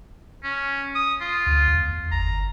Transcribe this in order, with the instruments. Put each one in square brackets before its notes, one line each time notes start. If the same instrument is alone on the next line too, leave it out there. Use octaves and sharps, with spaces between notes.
[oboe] C#4
D#6
F4
[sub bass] D2
E2
[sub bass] G1 [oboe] A#5